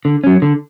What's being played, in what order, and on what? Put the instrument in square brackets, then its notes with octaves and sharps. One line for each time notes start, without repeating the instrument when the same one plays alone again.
[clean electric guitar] D3
F#3 C#4
D3